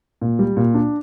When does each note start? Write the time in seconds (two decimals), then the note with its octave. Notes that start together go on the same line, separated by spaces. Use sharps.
0.22 A#2
0.39 G3
0.57 A#2
0.74 D4